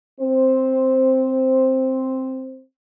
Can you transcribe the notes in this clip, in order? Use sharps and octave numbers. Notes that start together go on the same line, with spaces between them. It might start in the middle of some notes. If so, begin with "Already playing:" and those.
C4 C5